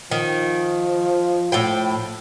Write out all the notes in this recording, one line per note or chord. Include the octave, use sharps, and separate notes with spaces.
D#3 F3
A2 F5 G5